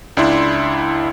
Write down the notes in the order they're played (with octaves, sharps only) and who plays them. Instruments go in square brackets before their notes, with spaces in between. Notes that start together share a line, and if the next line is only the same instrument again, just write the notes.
[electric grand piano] C#2 D4 E4 C6